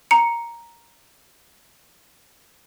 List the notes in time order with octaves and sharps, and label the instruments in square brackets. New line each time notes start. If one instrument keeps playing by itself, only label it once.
[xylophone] A#5 C#7